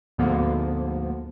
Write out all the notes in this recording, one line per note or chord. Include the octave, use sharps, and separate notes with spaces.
D2 G#2 D3 F3 A#3 B3